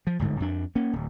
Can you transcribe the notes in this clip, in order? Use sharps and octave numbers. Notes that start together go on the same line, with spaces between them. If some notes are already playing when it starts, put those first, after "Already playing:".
F3
D1 G1 G#2 D3
F2 D4
A#3 C#4
D1